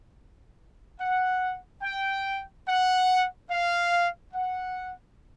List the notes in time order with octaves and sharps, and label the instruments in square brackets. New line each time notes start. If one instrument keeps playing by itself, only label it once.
[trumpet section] F#5
G5
F#5
F5
F#5